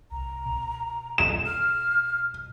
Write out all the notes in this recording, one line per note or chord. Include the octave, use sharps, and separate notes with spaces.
C2 A#5
B2
E7
F6